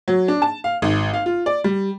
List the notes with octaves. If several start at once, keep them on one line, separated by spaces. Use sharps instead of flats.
F#3
D4
A5
F5
G#1
F5
F4
D5
G3